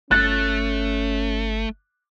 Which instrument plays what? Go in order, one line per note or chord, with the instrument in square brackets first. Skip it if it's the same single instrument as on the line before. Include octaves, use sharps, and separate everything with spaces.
[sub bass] G1 [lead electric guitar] A3 [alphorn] C#4 [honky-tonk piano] F#6 A6